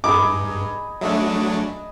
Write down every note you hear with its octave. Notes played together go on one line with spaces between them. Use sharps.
G2 D#4 G#4 B5 D6
F#3 A3 D4 D#5 E5